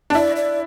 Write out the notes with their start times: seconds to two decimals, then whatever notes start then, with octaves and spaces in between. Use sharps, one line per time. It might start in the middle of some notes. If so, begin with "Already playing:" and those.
0.10 D4
0.15 E4 D5
0.36 D5